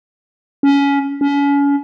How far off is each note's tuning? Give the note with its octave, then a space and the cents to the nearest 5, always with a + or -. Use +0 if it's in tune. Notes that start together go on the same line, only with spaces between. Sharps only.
C#4 +20
C#4 +35